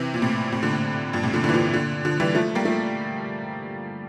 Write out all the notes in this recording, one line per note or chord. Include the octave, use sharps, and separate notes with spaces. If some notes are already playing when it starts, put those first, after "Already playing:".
Already playing: C3 E3
A#2
A2 C3
A2 C3
A#2 D3
A2
G2 A#2
A2 C3
A#2 D3
A#2 D3
E3
D3 F3
A#2 D3
D3 F3
E3 G3
F3 A3
G3 A#3
F3 A3